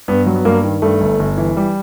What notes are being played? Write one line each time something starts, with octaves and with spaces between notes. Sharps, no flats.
G2 B3
F#3
B3
G2 A#3
D#3
G2 A3
G1
G1
E3
G3